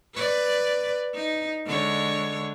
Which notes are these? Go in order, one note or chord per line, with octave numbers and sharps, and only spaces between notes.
B4 D5
D#4
D3 G#3 C#5